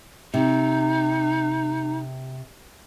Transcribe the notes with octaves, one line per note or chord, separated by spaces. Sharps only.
C3 D#4